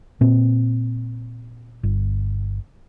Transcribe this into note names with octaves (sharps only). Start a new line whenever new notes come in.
A#2 C4
G1